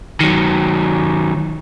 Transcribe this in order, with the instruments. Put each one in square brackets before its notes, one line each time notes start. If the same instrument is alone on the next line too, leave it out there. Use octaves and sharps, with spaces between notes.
[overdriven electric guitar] D#3 F#3